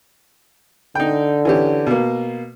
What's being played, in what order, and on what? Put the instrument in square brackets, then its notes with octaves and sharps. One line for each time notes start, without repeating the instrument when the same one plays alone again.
[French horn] D3 [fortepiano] D#4 G5
[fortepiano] E3 C#4 G4
B2 A#3